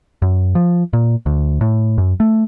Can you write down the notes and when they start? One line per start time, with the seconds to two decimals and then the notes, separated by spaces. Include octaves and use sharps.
0.22 F#2
0.55 F3
0.93 A#2
1.26 D2
1.61 A2
1.98 F#2
2.20 A3